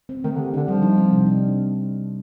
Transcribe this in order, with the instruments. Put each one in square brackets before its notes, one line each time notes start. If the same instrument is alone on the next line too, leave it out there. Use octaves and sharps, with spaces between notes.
[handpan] C4
[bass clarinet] D#3 [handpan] A3
[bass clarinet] D3
[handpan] G4
[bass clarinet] D3 [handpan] D4
[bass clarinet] F3 [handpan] G3
[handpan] D#4
C4
C3
D4